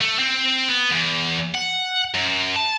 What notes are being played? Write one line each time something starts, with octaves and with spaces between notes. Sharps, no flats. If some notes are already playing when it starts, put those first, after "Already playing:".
A3
C4
B3
E2
F#5
F#2
A5